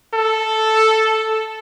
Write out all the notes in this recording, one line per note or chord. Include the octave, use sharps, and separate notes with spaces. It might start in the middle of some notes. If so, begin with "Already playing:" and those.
A4